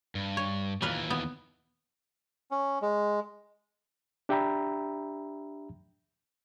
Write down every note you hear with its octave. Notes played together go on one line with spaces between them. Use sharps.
G2
C#5
D#2 A#2 E3 B4 F5
B3
C#4
G#3
D4 G4 E5 G5 A#5 B5